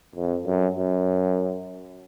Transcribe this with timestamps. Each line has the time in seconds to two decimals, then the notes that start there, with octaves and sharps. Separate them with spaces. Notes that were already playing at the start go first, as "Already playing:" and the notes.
0.15 F2
0.46 F#2
0.76 F#2